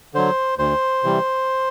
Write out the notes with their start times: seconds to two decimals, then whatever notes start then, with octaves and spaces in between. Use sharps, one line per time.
0.14 D3 F#3 C5
0.58 D2 C5
1.04 C3 E3 G3